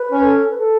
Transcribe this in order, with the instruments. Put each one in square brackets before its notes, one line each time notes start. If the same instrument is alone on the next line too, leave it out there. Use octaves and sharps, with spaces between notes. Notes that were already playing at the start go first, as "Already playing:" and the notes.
Already playing: [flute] B4
[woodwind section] C#4
[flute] A4
B4
A4